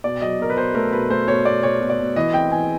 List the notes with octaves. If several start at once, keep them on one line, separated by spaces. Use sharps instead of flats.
B2 D5
F#3 D#5
B2 A#4
B4
B2 C5
A3 A#4
B2 B4
A3 C5
B2 C#5
B2 D5
B2 C#5
B2
D5
B2
E3 D#5
C4 G5
E3 G#5